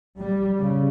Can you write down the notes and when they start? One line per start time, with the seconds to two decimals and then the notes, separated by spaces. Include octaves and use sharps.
0.18 G3
0.58 C#3